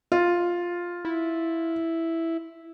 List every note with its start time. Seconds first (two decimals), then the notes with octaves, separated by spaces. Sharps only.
0.12 F4
1.05 E4